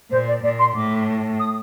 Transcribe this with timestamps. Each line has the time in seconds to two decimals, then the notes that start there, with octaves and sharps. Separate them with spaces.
0.11 A#2 C5
0.28 D5
0.42 A#2 D5
0.59 C6
0.75 A2 D6
1.39 D#6